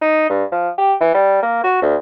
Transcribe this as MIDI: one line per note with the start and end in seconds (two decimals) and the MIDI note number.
0.02 0.28 63
0.30 0.44 43
0.52 0.69 53
0.78 0.94 67
1.01 1.13 52
1.14 1.39 55
1.43 1.63 58
1.64 1.81 66
1.82 1.96 38